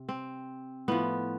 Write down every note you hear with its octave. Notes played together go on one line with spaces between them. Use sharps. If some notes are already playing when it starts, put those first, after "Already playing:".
Already playing: C3
C4
A2 F3 B3